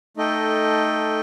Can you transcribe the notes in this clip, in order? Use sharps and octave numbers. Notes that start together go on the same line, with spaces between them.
A3 D#4 A4 D#5 G5